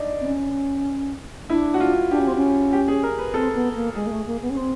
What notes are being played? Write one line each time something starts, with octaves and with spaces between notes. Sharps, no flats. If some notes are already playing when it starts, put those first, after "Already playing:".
Already playing: D4 D#4
C4
C#4
D4 E4
F#4
F4
D4 G4
C#4
C4
C#4
G4
G#4
A#4
B4
C4 A4
B3
A#3
G#3 G#4
A#3
A3
A#3
B3
C#4
C4